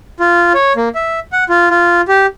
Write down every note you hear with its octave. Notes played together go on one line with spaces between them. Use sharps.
F4
C#5
A#3
E5
F#5
F4
F4
G4